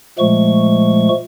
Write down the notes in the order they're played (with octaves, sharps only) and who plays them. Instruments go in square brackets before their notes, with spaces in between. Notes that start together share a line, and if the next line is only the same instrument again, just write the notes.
[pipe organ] A#2 F3 G#3 A3 C#6